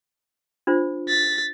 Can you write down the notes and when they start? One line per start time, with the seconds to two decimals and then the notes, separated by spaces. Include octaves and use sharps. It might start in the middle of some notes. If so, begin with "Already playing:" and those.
0.67 D4 F4 C5
1.09 A6 B6